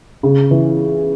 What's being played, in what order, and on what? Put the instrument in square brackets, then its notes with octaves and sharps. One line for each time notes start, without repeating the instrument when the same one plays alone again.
[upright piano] C#3
E3